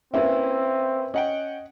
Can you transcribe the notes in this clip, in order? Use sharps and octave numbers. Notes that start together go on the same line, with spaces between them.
A#3 C4 C#4 E4 B4 E5
C#4 D#5 F#5 G5